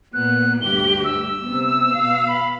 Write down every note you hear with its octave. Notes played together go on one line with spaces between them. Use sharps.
A#2 B3 F#6
D2 G2 G4 G7
E6
C3 B3
B2 F5
B5